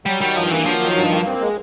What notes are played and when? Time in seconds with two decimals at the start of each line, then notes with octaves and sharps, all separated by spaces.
0.06 F#3 G3
0.21 D#3 G3
0.36 G2 F3
0.50 E3 A#3
0.66 F3 F#3
0.81 D#3
0.96 G2
1.11 A#3
1.26 C4
1.41 G#3